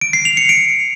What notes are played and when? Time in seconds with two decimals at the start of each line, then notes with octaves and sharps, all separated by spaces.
0.01 D7
0.13 C7
0.25 F7
0.37 C#7
0.49 D7